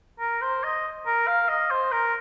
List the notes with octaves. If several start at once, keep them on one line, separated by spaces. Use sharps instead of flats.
A#4
C5
D#5
A#4
F5
D#5
C5
A#4